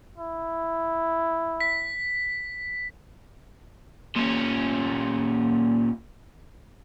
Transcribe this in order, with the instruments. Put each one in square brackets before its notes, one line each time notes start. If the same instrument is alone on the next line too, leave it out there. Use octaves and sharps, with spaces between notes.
[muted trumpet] E4
[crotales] B6
[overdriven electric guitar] A#2 C#4